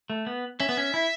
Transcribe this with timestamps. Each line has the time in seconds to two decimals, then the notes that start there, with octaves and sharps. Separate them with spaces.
0.10 A3
0.27 B3
0.60 C#4 E5
0.69 B3
0.77 C#4
0.94 E4